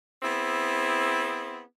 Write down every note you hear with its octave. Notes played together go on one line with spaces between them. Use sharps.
B3 C4 E4 G#4